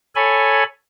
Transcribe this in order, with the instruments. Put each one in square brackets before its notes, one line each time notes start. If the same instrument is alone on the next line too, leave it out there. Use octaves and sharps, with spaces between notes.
[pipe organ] A4 C#5 G#5 B5